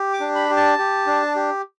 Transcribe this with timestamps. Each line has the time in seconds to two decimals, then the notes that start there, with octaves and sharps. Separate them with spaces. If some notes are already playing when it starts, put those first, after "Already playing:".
Already playing: G4
0.13 D6
0.20 D4
0.35 B5
0.50 G4
0.57 A5
0.78 G4
1.07 D4
1.36 G4